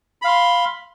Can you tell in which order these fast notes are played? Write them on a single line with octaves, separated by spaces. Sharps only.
B5 F5 C6